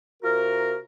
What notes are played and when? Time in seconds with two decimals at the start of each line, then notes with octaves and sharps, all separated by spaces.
0.23 C3 F4 F#4 A#4